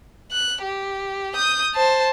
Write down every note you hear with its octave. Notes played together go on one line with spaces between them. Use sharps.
F#6
G4
D#6 G6
C5 A5